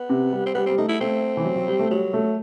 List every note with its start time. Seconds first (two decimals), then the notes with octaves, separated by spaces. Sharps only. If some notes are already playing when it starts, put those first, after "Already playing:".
Already playing: B3
0.10 C3
0.33 G3
0.46 C4
0.55 G3 B3
0.66 G3 C4
0.78 A3 D#4
0.89 E4
1.00 A3 C4
1.37 E3
1.45 F#3
1.56 F#3
1.68 G3
1.80 A3
1.90 F#3 G3
2.14 A3